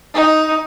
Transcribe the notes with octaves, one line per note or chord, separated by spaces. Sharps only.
D#4